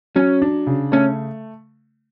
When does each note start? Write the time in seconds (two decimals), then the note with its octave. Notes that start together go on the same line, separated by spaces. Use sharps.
0.16 F#3 C#4
0.42 D4
0.67 C#3
0.92 A3 C#4